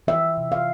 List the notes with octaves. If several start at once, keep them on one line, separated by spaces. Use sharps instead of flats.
E3 E5
C3
F5